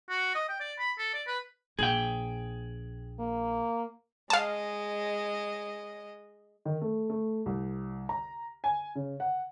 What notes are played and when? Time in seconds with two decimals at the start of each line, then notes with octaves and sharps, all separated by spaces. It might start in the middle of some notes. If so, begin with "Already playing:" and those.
0.09 F#4
0.35 D#5
0.49 G5
0.60 D5
0.79 B5
0.98 A4
1.14 D5
1.27 B4
1.79 A#1 G#4 G5
3.20 A#3
4.30 G#3 D#5 F5 A5
6.65 D#3
6.81 A3
7.10 A3
7.46 C2
8.09 A#5
8.64 G#5
8.95 C#3
9.20 F#5